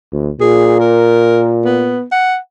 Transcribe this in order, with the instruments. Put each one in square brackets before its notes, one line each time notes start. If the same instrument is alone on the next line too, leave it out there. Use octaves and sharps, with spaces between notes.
[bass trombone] D2
[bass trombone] A#2 [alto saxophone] G#4
[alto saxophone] A#4
B3
F#5